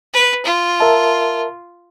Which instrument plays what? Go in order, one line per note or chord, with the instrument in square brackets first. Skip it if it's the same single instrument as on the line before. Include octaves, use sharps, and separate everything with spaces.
[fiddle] B4
F4
[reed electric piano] A#4 E5 A5